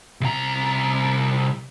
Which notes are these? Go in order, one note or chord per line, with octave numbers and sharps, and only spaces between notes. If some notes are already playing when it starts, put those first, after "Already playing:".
C2 A#5